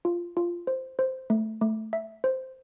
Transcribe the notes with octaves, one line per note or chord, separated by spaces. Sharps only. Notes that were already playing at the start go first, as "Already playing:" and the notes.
F4
F4
C5
C5
A3
A3
E5
C5